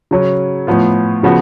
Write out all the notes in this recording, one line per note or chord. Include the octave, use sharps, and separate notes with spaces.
C#3 F#3 C#4
A2 F3 B3 F4
C#3 F3 B3 F#4